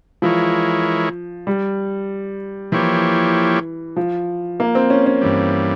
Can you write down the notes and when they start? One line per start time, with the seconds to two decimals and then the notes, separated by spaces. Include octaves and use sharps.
0.22 E3 F3 G#3 E4 A#4 C#5
1.47 G3
2.72 E3 F3 A#3 E4 G4 C#5
3.96 F3
4.60 A#3
4.75 C4
4.90 C#4
5.06 C#4
5.21 G2 E3 G3